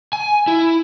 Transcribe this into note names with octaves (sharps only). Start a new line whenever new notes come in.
G#5
E4